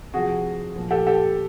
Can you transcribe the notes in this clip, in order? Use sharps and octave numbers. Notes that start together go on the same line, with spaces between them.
C3 F3 F#4 G#4
A#2 F3
G4 A4
G4 A4